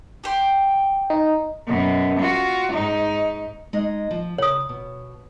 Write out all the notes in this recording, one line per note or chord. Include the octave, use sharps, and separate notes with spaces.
G4 G5 C6
D#4
F#2 B2
F4 F#4
G#2 D#4
G#3 D#4 D#5
F3
C#3 C#5 D#6
B2